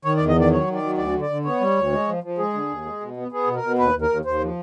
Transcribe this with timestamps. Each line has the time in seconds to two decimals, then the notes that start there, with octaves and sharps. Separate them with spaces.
0.05 D#3 C#5
0.17 D5
0.21 E2
0.28 D#5
0.36 D#3 D5
0.52 F#3 C#5
0.67 D#3
0.75 D5
0.83 F#3
0.98 D2 D5
1.14 D3
1.22 D5
1.30 D3
1.45 B3 C#5
1.61 G3
1.77 D2
1.92 G#3
2.08 F3
2.23 F3
2.38 G#3 G#4
2.54 D3
2.69 D#2
2.86 G#3
3.01 B2
3.17 B3
3.31 B3 G#4
3.47 B2
3.56 A#4
3.63 B2
3.78 D#2 B4
3.95 D#2
4.02 A#4
4.09 D#2
4.25 D#2 C5
4.42 F3